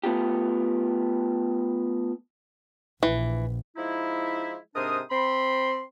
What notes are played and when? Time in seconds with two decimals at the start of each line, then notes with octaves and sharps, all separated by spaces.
0.04 A3 B3 F4 G4
3.03 A#1 E3
3.77 F3 G#3 D#4 E4
4.75 G#2 C3 D4 A#4 C5 D#6
5.11 C4 B5 C6